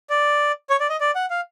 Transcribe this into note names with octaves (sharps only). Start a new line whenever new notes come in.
D5
C#5
D5
D#5
D5
F#5
F5